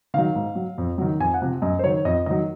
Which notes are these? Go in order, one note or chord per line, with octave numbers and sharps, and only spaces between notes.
D#3 F#3 F5
G#2
F#3
F2
D#3 F#3
F2 G#5
F#5
C3 F3
F#2 D#5
C5
D#3 F#3 C#5
F2 D#5
D#3 F#3 D#5